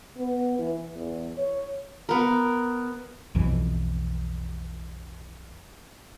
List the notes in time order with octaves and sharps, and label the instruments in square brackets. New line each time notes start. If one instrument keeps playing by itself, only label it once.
[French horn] B3
E3
E2
C#5
[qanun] B3 A#4
[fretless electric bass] B1 F2 E3